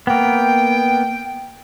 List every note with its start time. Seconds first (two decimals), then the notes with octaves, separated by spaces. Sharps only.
0.07 A#3 B3 G5